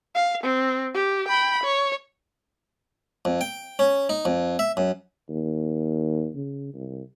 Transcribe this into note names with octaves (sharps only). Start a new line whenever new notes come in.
F5
C4
G4
G5 B5
C#5
F2
G5
C#4
D#4
F2
E5
F#2
D#2
C#3
C2